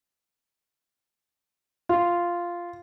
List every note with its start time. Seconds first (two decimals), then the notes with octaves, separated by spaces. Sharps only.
1.89 F4